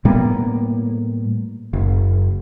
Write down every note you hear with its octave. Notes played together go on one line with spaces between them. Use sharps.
A2 G3 A#3 B3
F#1